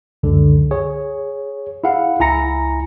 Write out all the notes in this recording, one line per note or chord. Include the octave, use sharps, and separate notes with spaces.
C#2 F#2 D3
G#4 C#5
E4 G#4 F5 F#5
C#2 E4 G#5 A#5 A#6 C#7